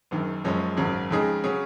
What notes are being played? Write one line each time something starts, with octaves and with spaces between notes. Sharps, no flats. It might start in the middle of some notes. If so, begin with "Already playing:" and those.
F#1 F#2 D#3
F#1 F#2 F3 G#3 C#4
G#1 F#2 C#3 F#3
F2 C#3 G#3 D#4 G#4
C#3 F#3 C#4 G#4